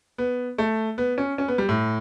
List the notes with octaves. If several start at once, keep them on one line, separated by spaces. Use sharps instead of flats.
B3
A3
B3
C#4
C#4
B3
G3
A2